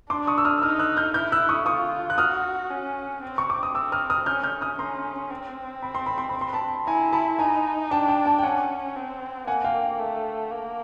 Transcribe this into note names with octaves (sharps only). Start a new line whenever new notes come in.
D4 C6 D6
C#6 D#6
E6
D#6 F6
E6
D#4 D#6 F6
E6 F#6
F6 G6
E4 F6 G6
E6 F#6
C#6 D#6
F4 C#6 D#6
F#6
F#4 D#6 F6
C#4
C4
C#6
D6
D#6
C4 D6 E6
D#6 F6
D#6 F6
C#4 F6 G6
F6 G6
D#6 F6
C#4 A#5 C6
C4
B5
C6
B5
C6
B5
C6
A5 B5
E4 G#5 A#5
A5 B5
D#4 G#5 A#5
D4 G5 A5
G5 A5
G5 A5
G5
C#4 F#5 G#5
C4
A#3 F#5 G#5
F5 G5
A3
A#3